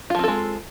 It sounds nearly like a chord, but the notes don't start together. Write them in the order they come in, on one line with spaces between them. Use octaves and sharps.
F4 F3 C4 A4 G#3